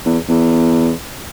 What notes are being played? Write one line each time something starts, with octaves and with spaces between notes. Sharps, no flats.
E2
E2